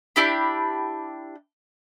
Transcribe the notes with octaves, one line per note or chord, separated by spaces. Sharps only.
D4 E4 G4 B5